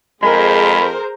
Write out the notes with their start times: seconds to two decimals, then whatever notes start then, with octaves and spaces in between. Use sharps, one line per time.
0.23 F2 G#3 G#4 A#4 C5 B5